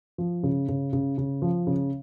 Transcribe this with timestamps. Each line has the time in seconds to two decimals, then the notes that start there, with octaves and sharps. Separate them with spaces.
0.18 F3
0.43 C#3
0.68 C#3
0.93 C#3
1.18 C#3
1.42 F3
1.67 C#3